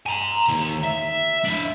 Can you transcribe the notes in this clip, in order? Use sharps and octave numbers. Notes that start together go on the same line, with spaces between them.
G#5 A#5
D#3 A#3
E5
D4 E4